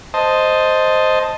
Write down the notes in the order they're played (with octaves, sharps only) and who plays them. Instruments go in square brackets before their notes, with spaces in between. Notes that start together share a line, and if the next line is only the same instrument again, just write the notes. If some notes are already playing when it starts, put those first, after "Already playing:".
[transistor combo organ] C5 D#5 A5